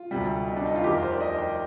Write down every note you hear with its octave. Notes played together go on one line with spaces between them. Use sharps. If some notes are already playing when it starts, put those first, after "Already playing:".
Already playing: F4
D2 C3 G3
D#4
D4
D#4
F4
F1 D#2 D#3 G4
A#4
C5
D5
D#5
G5